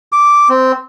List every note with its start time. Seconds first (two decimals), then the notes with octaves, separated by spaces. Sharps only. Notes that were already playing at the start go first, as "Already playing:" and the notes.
0.12 D6
0.49 C4